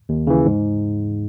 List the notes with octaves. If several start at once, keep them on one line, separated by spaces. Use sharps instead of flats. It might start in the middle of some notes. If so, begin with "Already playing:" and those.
D#2
C#3 E3
G#2